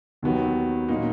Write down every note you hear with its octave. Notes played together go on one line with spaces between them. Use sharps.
D#2 D#3 F#3 B3
A#2 F#3 A#3 D#4